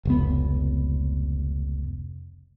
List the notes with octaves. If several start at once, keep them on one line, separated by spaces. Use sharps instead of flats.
F1 C#2 B3